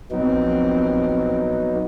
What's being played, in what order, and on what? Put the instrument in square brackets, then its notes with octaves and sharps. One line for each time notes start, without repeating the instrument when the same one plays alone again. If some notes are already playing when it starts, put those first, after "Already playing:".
[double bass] A#1 C4 [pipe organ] F#3 B3 D#4